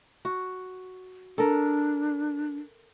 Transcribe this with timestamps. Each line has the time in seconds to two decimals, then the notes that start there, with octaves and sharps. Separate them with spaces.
0.25 F#4
1.38 D4 A4 A#4